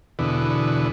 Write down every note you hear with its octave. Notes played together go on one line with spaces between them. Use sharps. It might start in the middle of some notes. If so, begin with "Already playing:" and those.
E2 B2 D3